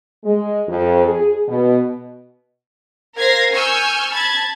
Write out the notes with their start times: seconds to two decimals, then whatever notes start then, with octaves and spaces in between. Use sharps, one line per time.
0.23 G#3
0.67 F2
1.05 G#4
1.47 B2
3.16 A#4 C5 F5 G#6 A#6 C7
3.52 G#5 C#6 E6 F6 G6
4.12 A5 B5 G#6 A6